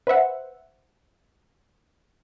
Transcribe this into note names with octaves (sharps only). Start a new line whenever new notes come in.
B4 C5 E5 F#5